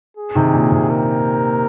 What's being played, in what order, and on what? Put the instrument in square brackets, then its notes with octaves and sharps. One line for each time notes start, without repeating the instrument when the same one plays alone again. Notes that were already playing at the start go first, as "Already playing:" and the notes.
[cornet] G#4
[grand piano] C3 D#3
A#2
C3
[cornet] A#4